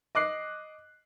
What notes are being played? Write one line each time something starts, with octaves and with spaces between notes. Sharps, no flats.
D#5 D6 F#6 C7